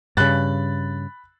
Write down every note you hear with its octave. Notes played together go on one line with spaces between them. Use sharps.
G2 C#3 B5 F#6 A6